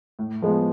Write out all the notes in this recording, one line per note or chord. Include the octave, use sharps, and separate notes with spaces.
A2
F3 G#3 B3